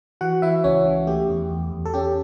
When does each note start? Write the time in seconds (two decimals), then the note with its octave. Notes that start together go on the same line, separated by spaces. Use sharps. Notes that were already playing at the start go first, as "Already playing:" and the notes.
0.21 E3 F#4 F#5
0.42 E3 E4 E5
0.64 C#2 C#4 C#5
0.87 E3
1.07 A3 G4
1.29 E2
1.51 E2
1.72 E2
1.85 A4
1.94 C#4 G4